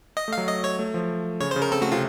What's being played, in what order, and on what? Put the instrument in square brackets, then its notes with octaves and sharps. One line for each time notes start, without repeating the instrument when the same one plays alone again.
[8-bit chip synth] D#5
[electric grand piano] A3
[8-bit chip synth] F5
[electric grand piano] F#3
[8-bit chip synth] D#5
C#5
[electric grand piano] A3
F3
[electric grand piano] C#3 [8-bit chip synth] C#5
[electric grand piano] C#3 [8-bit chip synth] C5
[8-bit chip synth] A#4
[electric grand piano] C4 [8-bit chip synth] A4
[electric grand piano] A3 [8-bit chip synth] F#4
[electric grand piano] C3 [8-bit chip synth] F4